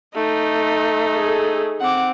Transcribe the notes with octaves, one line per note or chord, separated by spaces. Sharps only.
A3 D#4
G#4 A4
C4 F#5 D6